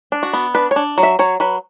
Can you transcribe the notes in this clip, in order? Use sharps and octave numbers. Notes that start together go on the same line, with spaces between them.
D4
F#4
B3
D4 B4
C#5
D4
F#3
E5
F#3 C#5
F#3 B4